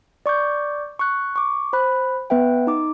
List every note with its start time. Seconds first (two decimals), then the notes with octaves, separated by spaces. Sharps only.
0.26 D5 C#6 D6 G6
0.99 C#6 F#6
1.36 C#6 D6
1.73 C5 B5 F#6
2.30 B3 B4 E5 G5
2.67 D#4 D6